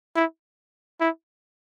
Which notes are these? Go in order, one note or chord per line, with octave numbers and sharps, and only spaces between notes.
E4
E4